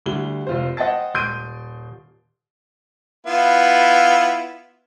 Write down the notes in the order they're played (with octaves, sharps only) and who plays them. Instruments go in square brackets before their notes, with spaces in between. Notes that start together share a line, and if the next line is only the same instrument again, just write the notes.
[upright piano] D2 D3 G3 G7
F1 F4 C5
C5 D#5 F#5 G5 A5 A6
D#1 C6 G6 D7 D#7
[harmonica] B3 E4 F4